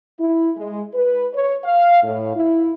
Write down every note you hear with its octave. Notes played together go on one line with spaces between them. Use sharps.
E4
G#3
B4
C#5
F5
A2
E4